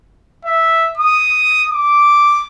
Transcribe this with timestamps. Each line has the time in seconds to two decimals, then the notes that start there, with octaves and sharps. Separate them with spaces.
0.45 E5
0.98 D#6
1.71 D6